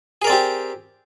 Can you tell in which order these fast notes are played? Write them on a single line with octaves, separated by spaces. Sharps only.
G#4 A#4 D5 C4 G4